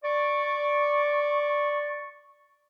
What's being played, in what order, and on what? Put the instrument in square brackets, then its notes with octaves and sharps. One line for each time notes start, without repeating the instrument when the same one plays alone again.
[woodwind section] D5 C#6